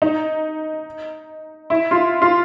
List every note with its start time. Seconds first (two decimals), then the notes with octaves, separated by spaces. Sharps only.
0.02 D#4
1.70 E4
1.91 F4
2.22 F4